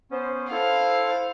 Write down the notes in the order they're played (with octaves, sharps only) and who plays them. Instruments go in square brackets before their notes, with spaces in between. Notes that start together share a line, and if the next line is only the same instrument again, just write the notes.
[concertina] B3 C#4 [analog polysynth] C5
[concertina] E4 A4 [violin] F5